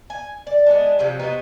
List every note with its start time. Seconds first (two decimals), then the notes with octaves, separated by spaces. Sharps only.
0.10 G#5
0.47 D5
0.66 G#3 B3 D4
0.99 C3 F3 F#3 C4
1.19 C3 B3 D#4 F#4